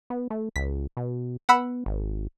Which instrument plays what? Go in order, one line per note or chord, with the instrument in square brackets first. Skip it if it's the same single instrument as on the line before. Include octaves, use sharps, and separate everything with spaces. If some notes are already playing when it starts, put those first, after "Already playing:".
[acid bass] B3
A3
[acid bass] C#2 [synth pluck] B6
[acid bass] B2
[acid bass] B3 [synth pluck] F#5 B5 E6
[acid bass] G#1